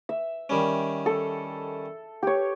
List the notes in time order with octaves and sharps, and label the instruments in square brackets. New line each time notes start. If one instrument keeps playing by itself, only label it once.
[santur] E5
[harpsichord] D#3 G3 C#4
[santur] A4
G4 C#5